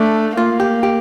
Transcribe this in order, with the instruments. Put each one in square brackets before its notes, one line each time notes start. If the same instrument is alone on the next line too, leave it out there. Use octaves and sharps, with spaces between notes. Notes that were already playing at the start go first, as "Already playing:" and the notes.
Already playing: [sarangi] A3 [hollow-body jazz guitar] D4
[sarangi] A#3 [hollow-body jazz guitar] F4
[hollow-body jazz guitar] G4
G4